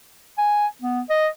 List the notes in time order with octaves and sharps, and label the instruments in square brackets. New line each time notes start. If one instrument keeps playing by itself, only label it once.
[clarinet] G#5
B3
D#5